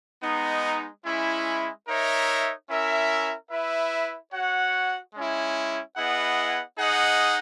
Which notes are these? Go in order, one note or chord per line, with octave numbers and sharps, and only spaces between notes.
G#3 B3 D#4
G#3 C#4 E4
D#4 A#4 C#5 E5
C#4 E4 A#4 E5
E4 B4 E5
F#4 C#5 F#5
G#3 C#4 E4
B3 E4 G#4 D#5 F#5
D#4 G#4 D#5 F#5